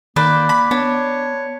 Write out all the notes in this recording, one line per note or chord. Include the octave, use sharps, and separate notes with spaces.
D#3 A#3 B4 C5 D5
B5
B3 D4 C#5